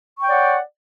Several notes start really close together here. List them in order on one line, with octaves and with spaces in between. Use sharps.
C#6 G5 C#5 D5 F#5